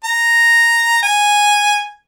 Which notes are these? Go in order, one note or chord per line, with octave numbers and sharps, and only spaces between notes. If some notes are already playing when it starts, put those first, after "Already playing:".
A#5
G#5